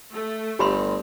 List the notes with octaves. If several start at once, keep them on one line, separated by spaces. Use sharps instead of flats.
A3
G1 G4 B5 C6